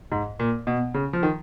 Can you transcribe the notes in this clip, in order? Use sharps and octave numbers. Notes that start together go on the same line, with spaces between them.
G#2
A#2
B2
C#3
F3
D#3